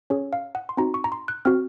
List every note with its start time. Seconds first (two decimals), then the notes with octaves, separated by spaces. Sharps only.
0.10 C#4 G#4 C#5
0.33 F5
0.55 F#5
0.69 C6
0.77 C4 D#4 F#4 A#5
0.94 C#6
1.04 A#5
1.12 C6
1.28 F#6
1.45 C4 F#4 F6